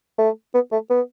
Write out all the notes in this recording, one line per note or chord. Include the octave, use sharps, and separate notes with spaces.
A3
B3
A3
B3